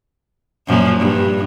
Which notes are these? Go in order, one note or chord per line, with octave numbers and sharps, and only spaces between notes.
F#2 A#2 F3
G2